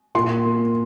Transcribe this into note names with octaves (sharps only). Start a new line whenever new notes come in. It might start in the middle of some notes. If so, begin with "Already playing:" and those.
A#2 C6
A#3